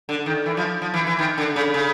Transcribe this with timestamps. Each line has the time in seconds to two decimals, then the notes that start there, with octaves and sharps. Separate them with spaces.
0.09 D3
0.26 D#3
0.46 E3
0.57 F3
0.82 F3
0.94 E3
1.07 E3
1.19 D#3
1.38 D3
1.56 C#3
1.74 C#3